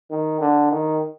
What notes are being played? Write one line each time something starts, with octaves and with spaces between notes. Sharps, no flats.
D#3
D3
D#3